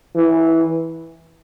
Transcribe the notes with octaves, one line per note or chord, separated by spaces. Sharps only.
E3